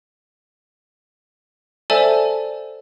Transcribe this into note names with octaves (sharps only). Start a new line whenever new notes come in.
A4 C5 D5 E5 G#5 A5